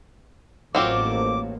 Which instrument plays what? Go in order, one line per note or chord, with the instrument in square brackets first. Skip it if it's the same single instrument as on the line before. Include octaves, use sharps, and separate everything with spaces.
[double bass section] A1 A2 A#3 [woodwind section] F2 D6 [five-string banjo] F#3 C4 F4